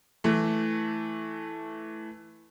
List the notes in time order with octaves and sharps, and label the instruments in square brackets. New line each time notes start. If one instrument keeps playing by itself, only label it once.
[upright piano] E3 A3